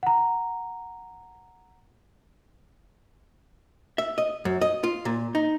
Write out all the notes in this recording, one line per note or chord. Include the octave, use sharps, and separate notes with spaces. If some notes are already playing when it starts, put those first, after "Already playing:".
F#5 A#5
E5
D#5
F#2
D#5
F4
A#2
D#4